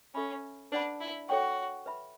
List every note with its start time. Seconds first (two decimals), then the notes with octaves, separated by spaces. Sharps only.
0.14 C#4 A4 E5 B5
0.72 D4 B4 D5 F#5 B5
1.01 E4
1.29 F#4 A4 C#5 G5 C#6
1.86 B4 E5 B5